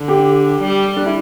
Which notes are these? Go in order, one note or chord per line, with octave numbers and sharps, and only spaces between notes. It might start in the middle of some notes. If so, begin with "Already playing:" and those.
Already playing: D3
G4
G3
D4
E4